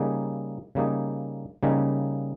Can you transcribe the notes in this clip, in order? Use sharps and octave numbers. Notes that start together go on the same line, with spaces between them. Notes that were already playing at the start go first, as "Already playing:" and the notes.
Already playing: C#3 G3 A#3 D#4 G#4
C#3 G3 A#3 D#4 G#4
C#3 G3 A#3 D#4 G#4